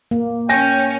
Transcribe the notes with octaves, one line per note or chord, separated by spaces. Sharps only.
A#3
C#4 G5 G#5 A#6